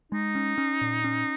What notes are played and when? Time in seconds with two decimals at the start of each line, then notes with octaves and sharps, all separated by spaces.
0.12 G#3 D#4
0.35 C#4
0.58 C#4
0.81 A#2
1.04 C#4